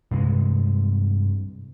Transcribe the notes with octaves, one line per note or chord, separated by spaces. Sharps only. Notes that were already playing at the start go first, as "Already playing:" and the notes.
G2 C3 G#3